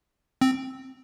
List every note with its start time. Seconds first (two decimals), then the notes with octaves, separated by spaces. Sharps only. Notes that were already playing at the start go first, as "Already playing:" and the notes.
0.41 C4